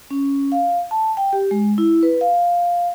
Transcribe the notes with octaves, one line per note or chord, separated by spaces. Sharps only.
C#4
F5
A5
G5
G4
G#3
E4
B4
F5